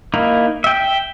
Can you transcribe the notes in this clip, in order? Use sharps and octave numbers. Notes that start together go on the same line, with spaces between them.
A#3 D#4 E4
E5 G5